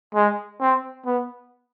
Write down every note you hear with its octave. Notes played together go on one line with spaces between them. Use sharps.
G#3
C4
B3